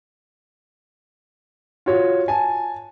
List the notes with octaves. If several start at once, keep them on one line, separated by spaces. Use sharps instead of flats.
F4 F#4 C#5
G#5 A5